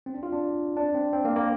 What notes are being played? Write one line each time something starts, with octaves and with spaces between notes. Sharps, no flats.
C4
D4
F4
D4
D4
C4
C4
A#3
A#3